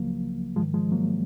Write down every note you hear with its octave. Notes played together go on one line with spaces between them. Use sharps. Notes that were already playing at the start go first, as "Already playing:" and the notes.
Already playing: C#2 C#3 F3 F#3 A#3
G#2 D#3 F3 G#3
F3 G#3
F#3 A#3